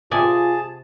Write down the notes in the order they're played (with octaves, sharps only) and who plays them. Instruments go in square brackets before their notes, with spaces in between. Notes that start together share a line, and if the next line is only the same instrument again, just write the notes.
[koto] C3 D5 G#5 [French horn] F4 [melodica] G#4 A5 [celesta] D#6